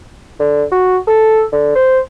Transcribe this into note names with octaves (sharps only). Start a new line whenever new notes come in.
D3
F#4
A4
D3
C5